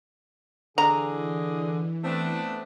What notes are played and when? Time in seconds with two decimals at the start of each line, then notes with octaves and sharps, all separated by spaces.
0.78 D3 E3 G#4 D#5 A#5
2.04 A3 B3 C4 D4